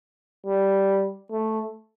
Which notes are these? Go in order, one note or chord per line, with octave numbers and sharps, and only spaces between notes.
G3
A3